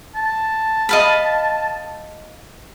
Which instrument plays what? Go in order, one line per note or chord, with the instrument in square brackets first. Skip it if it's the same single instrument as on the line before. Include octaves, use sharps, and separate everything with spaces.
[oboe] A5
[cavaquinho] D#5 F5 B5